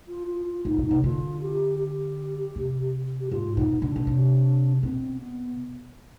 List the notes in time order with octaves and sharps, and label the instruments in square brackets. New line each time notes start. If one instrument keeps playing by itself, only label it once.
[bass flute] F4
F4
F4
[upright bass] G#2 [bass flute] D#4
[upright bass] B2
[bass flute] D#4
[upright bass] C3
[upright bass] D3 [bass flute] F4
[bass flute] G4
G4
[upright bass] C3
[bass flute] G4
[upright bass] G#2 [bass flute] F4
[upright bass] B2 [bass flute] D#4
[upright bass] D3 [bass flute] D4
[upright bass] B2
C3
[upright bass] B2 [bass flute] C4
[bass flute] B3